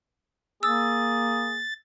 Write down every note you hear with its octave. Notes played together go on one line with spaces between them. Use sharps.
A#3 G#4 E6 A6